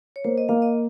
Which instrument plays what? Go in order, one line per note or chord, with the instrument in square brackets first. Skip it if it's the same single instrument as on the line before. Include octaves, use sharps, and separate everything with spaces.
[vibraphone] C#5
[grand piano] A#3 [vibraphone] C5
[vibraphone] D#5
[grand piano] A#3 [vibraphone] F5
[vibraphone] D#5